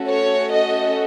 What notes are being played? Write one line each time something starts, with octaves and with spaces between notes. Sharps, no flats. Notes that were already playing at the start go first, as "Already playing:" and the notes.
Already playing: A3 C#4 F#4 A4
C#5
D#5